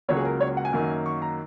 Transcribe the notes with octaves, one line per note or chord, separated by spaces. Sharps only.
C#2 C#3 F#3 A#3 C#5
G#4
A#4
C#5
F#5
G#5
F#2 D#3 F#3 A#3
C#6
A#5